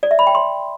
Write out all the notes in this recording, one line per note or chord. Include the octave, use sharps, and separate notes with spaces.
D5
E5
B5
G5
C6